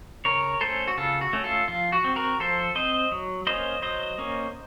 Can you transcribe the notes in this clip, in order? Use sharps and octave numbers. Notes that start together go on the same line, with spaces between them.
C#3 A#4 C#5
A3 C#4 A4 C5
F#4
C#3 F4 A4
F#4
A3 C#4
F4 A4
F3 F4
F#4
C4
F#4 A#4
F3 A4 C5
C4 C5 D#5
F#3
A#3 C#4 C5 D#5
F#3 C5 D#5
A#3 C#4